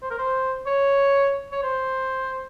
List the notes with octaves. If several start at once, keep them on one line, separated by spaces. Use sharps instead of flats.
C5
A#4
C5
C#5
C#5
C5